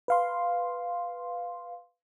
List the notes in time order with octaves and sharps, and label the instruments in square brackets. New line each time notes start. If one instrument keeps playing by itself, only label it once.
[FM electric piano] B4 F5 C6